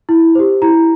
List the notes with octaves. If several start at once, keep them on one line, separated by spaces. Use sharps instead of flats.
E4
G4 C5
E4 A#5